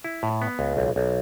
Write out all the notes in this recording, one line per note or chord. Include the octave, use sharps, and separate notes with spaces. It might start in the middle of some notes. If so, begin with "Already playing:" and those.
E4
A2
B3
C#2
B1
B1